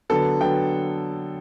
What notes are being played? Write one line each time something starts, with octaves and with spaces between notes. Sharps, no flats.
D3 F#3 B3 A4
D3 F#3 B3 G5